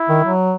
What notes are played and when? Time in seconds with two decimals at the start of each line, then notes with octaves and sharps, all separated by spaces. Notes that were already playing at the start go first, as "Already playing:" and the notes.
Already playing: E4
0.09 D#3
0.24 F#3